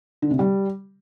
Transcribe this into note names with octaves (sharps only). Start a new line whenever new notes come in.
D3
C3
G3